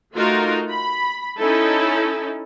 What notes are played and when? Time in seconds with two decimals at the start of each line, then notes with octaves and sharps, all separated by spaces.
0.14 A3 D#4 F4 F#4 A#4
0.71 B5
1.39 C#4 D#4 E4 A4